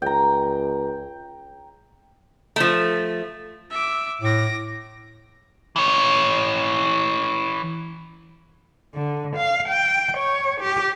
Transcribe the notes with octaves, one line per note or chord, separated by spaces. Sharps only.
C#2 G5 A#5
F3 A3
E5 D6
A2 D6 A#6
E3 C#5
D3
F5
G5
C#5
G4